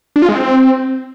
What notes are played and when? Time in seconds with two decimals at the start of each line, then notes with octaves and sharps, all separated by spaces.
0.16 D4
0.22 F4
0.29 G#3
0.35 C4